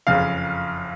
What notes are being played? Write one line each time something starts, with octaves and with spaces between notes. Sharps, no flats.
F#1 F2 C#3 F5